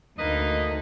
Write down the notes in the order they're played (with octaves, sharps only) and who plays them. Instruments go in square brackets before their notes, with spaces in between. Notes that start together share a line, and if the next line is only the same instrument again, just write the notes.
[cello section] D2 D#4 [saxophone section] A#3 B4 D#5